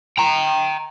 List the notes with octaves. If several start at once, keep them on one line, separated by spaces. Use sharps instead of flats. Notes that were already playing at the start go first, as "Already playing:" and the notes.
G5 A#5